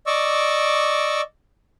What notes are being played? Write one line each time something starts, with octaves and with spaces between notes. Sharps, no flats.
D5 D#5 C#6 D6 E6